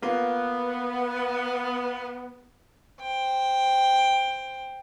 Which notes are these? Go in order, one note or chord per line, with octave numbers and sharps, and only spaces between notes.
A#3 B3 F4
C5 G5